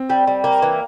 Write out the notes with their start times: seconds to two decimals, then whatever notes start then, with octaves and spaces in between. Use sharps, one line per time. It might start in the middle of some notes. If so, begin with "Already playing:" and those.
Already playing: C4
0.10 G3
0.27 G3
0.44 A#3
0.62 E3